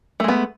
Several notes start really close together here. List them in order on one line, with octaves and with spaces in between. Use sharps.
A3 G#3 B3